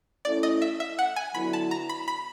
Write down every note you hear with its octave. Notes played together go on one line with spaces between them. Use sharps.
A3 C#4 E4 A4 D5
D#5
E5
E5
F#5
G#5
D3 F#3 B3 E4 B5
A5
A#5
B5
B5